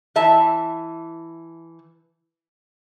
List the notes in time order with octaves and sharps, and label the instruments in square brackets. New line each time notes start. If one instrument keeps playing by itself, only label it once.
[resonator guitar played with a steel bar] E3 E5 A5